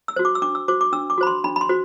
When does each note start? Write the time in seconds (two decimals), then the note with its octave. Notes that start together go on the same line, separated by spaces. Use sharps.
0.08 E6
0.16 F#4 C5
0.25 D6
0.35 E6
0.42 D4 D6
0.55 E6
0.68 F#4 C5 D6
0.81 D6
0.92 D4 E6
1.10 D6
1.18 F#4 C5 B5
1.27 C6
1.44 D4 B5
1.56 B5
1.61 C6
1.69 F#4 C5